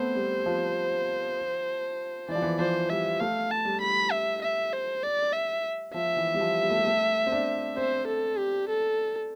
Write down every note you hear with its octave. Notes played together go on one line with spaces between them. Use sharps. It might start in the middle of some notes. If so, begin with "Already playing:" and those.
Already playing: A3 B3 C4 C5
G3
F3
E3 D5
F3
E3
F3 C5
G3 E5
A3 F5
A5
G3
B5
E5
E5
C5
D5
E5
F3 E5
E3
G3
F3
G3
A3
G3
A3
C4
D4
C4 C5
A4
G4
A4